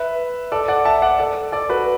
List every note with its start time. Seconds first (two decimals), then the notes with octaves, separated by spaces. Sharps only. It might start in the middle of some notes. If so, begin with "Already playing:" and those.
Already playing: B4 E5
0.52 A4 D5
0.68 D5 F#5
0.85 E5 A5
1.02 D5 F#5
1.19 A4 D5
1.52 A4 D5
1.69 F#4 B4